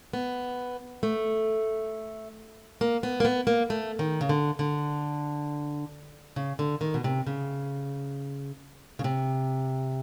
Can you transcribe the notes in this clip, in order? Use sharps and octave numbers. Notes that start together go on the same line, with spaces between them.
B3
A3
A#3
B3
A#3
B3
A#3
A3
D#3
C#3
D3
D3
C#3
D3
D#3
B2
C3
C#3
C#3
C3